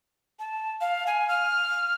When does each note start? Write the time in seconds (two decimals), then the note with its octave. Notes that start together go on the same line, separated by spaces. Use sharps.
0.39 A5
0.81 F5
1.07 G#5
1.28 F6